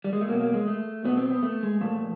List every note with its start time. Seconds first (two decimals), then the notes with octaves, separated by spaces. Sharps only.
0.04 G3
0.13 G#3
0.21 A3
0.28 B2 F#3 A#3
0.41 A#3
0.54 G#3
0.67 A3
1.05 B2 F#3 B3
1.17 C4
1.31 B3
1.43 A3
1.63 G#3
1.81 A#2 F3 A3